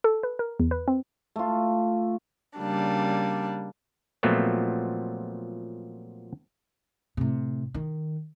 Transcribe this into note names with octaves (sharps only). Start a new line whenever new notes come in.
A4
B4
A#4
E2
B4
C4
A3 F4
C#3 G3 A#3 D4
A#2 F3 F#3 A3 B3 C4
A2 C3
D#3